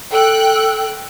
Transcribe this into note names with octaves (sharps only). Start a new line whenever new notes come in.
A4 G5 F#6